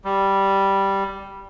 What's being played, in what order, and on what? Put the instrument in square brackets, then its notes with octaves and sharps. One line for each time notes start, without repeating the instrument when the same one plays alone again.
[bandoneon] G3